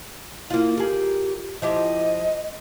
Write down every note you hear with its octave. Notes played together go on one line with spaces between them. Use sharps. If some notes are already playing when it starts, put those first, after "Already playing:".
A#3 E4 F4
G4 G#4 A#4
F3 E4 G4 D#5